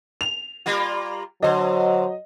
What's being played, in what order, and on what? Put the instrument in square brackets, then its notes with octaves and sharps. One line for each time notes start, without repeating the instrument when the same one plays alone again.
[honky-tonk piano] F7
[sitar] G3 A#3 F4
[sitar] D3 C5 [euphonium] F#3 [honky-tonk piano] D#5